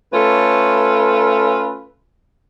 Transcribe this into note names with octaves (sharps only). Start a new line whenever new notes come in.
A3 C#4 F4 A4 B4